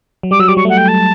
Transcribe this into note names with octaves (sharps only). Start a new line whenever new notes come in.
F#3
G3 D6
F#3 E6
G3 D6
F#3 C#6
A3 F#5
G5
A5